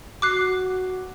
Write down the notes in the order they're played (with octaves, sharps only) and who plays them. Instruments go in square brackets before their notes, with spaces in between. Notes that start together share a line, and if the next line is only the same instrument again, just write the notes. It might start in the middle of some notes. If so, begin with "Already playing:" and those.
[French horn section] F#4 [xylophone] D6 F#6 C7